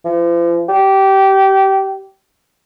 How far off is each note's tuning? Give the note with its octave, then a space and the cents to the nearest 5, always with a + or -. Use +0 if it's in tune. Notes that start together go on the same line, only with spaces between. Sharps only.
F3 -40
G4 -20